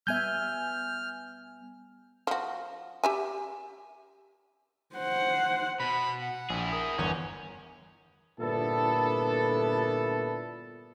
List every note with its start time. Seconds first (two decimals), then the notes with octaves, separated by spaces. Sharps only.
0.07 G3 B3 E5 G#5 F6 G6
2.27 F3 F#4
3.04 G4 E5 G#5
4.95 C5 F#5
5.80 B2 B5
6.22 F#5
6.50 A#1 E4 G#4
6.72 A#4 D#6
6.98 G1 E2 C#4 D#7
8.39 G1 A#2 B3 D4 E4 A4